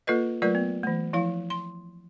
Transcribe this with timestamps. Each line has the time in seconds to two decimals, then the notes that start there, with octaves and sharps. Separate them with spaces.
0.07 A#3 F4 A4 B4 D#5
0.42 F#3 A3 F4 A#4 B4 D5
0.55 B3
0.83 E3 A3
1.13 F3 E4 F5
1.50 C6